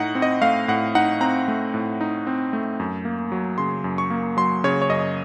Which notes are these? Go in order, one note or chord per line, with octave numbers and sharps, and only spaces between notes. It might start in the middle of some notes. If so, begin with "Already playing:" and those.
Already playing: A2 D#4 F#5
C4
D#5
A3 F5
A2 F#5
D#4 F#5
C4 A#5
A3
A2
D#4
C4
A3
F#2
A#3
F#3
C#3 C6
F#2
C#6
A#3
F#3 C6
C#3 C#5
C#5
F#2 D#5